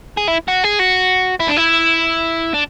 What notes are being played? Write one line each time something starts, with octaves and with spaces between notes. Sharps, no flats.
G#4
E4
F#4
G#4
F#4
E4
D4
E4
D4